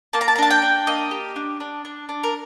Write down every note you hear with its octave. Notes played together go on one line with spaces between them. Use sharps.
A#3 A5
A#5
A5
A#5
D4 A5
G5
D4
A#3 D#5
G4
D4
D4
D4
D4
A#4